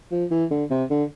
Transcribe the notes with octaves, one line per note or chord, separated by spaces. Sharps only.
F3
E3
D3
C3
D3